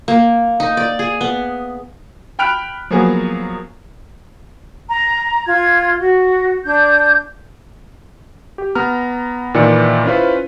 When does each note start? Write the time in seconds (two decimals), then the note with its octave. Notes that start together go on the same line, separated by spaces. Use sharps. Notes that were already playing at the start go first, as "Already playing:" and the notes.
0.08 A#3
0.60 D#4
0.77 D5
0.99 G#4
1.21 B3
2.39 G5 B5 F6 F#6 D7 F7
2.90 F3 F#3 A#3 B3 G#4
4.89 A#5
5.46 F4 G#6
5.98 F#4
6.64 D4 G6
8.58 G4
8.75 B3 A#5 F6
9.54 A#2 D#3 E3 B4 D5 C#7
10.06 C#4 E4 F4 B4 C5